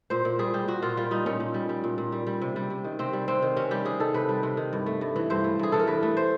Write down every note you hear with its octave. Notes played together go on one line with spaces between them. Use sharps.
A#2 C5
A#2
G3 G#4
G3 G4
A#2 F#4
A#2 F4
G3 F4
G3 D#4
A#2 C#4
A#2
G3
G3
A#2
A#2
G3
G3
C3
G3
C3
D#3
C3 C4
G3
C3 C4
D#3
C3 C#4
G3 G4
C3 G#4
D#3 A4
C3 B4
G3
C3
D#3
G2
A3
G2
E3
G2 C5
A3
G2 G#4
E3 A4
A#4
G2 B4
A3
C5